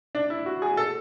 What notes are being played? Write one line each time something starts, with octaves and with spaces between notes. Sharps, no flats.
D4
E4
F#4
G#4
A4